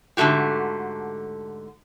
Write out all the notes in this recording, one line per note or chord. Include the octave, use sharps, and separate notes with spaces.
G#2 D3 E3 A3 F#4 G4